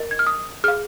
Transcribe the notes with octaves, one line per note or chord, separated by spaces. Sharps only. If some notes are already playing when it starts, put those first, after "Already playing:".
Already playing: A#4 D#5
G#6
F6
D#6
G#4 F5 F6